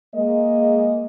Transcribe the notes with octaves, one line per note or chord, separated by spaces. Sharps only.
G#3 A#3 D#5